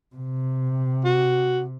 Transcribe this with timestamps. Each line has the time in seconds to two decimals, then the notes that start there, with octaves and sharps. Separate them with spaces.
0.16 C3
1.05 F#4